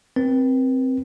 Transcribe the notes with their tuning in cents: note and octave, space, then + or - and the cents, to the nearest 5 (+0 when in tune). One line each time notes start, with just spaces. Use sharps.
C4 +0 B4 -45